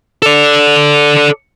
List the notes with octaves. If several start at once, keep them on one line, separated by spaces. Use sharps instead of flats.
A4 D5